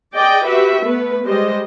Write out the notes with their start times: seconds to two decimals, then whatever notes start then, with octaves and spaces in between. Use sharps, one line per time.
0.14 G#4 D5 D#5 G5
0.44 F#4 G4 B4 E5
0.81 A3 B3 B4
1.24 G3 G#3 G4 C5 D#5